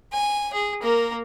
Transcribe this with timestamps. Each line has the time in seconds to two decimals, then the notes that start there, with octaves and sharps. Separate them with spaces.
0.12 G#5
0.53 G#4
0.82 A#3 A#4